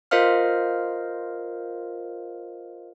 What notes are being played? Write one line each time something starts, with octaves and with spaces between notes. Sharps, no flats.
F4 A#4 C5 D#5 F5 F6